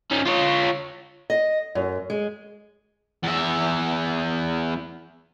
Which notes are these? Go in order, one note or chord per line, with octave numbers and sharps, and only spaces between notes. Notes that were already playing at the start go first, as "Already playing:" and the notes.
C#4 D#4
F4 C#5
D#5
F#2
G#3
E2 E5